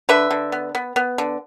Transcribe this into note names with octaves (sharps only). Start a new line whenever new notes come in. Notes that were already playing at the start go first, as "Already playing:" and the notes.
D3 B4 E5
D3
B3
B3
B3
D3